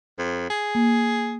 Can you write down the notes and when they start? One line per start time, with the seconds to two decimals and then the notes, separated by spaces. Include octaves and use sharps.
0.18 F2
0.50 G#4
0.75 A#3